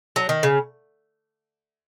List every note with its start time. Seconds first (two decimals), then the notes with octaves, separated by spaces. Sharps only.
0.16 F#3
0.29 D#3
0.43 C#3